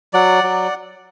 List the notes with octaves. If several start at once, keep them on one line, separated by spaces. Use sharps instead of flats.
F#3 D5 F#5
F#3